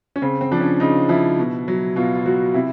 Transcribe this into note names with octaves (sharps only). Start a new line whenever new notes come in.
C#4
C#3 C4
C4
F3 D4
C#4
C#3 D#4
F3 E4
B2
F#3
B2 F4
F4
F#3 F#4
C3 E4